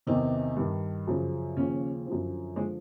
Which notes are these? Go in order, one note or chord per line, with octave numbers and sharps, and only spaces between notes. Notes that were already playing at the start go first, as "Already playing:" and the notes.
E2 C3 D#3 D#4
G2 D#3
F#2 C#3 F3
D#2 C#3 F3 C#4
F#2 D3 F3
D3 F3 G#3